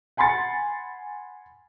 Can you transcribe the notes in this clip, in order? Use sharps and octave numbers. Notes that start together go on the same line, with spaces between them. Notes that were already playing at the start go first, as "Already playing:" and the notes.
F#5 G#5 B5 C6 A6 C#7